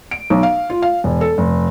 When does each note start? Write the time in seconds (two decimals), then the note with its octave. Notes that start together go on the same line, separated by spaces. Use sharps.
0.11 D7
0.30 B1
0.43 F5
0.70 F4
0.82 F5
1.04 E1
1.21 A4
1.38 F1